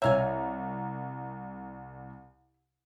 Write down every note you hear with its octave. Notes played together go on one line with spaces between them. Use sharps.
C2 C#5 E5 F5 G#5 A#5